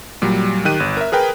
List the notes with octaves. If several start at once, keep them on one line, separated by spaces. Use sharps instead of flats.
A#2 F#3 G3
D#3 G4 F#6 D#7
G1
A#4 E5
G#4 A#4 B4 G5